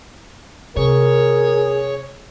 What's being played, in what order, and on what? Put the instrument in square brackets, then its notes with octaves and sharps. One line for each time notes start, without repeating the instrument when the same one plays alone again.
[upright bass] C3 [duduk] G#4 [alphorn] A#4 [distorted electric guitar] C#5